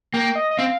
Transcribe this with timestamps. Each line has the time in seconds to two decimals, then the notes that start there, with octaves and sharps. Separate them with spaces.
0.13 A#3 G5
0.35 D#5
0.51 D#5
0.58 C4 F5